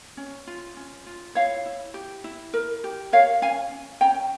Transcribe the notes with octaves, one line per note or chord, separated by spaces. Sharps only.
C#4
F4
C#4
F4
E4 C#5 F5
E4
G4
E4
A#4
G4
A#4 C#5 F5
C#4 F5 G#5
C#4
C#4 G5 A#5